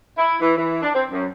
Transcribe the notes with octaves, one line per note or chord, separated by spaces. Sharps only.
E4
E3
E3
D4
C4
F#2